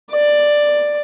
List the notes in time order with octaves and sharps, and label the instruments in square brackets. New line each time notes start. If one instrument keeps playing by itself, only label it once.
[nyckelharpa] D5